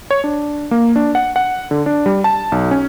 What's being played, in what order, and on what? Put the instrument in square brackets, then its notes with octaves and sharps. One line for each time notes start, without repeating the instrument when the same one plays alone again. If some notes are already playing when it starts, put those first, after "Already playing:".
[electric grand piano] C#5
D4
A#3
D4
F#5
F#5
D3
D4
G3
A5
B1
C#4